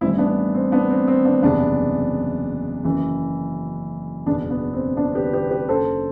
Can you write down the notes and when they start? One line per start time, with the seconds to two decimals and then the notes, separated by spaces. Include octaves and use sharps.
0.01 A1 G2 E3 C4 E4
0.18 B3 D4
0.54 C4
0.72 B3 D4
0.90 C4
1.08 C4
1.25 B3 D4
1.42 F#1 E2 C3 E3 B3 D4
2.84 F#1 F#2 E3
4.26 F#1 E2 B2 B3 D4
4.50 B3
4.73 C4
4.97 B3 D4
5.15 G4 B4
5.33 G4 B4
5.51 G4 B4
5.69 F#1 F#2 D3 A4 C5